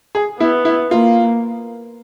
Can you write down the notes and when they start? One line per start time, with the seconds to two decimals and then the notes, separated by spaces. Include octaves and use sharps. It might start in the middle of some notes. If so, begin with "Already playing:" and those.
0.15 G#4
0.40 B3 E4
0.65 E4
0.91 A#3 F4